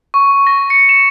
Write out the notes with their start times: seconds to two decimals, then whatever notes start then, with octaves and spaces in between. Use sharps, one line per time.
0.14 C#6
0.47 A#6
0.70 C#7
0.89 E7